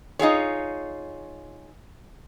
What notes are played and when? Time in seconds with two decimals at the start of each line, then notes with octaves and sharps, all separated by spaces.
0.19 D#4 F4 G#4 C#5